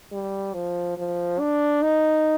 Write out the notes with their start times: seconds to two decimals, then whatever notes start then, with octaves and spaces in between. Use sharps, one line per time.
0.12 G3
0.54 F3
0.98 F3
1.39 D4
1.82 D#4